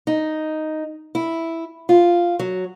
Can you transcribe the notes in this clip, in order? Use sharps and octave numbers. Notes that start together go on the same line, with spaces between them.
D#4
E4
F4
F#3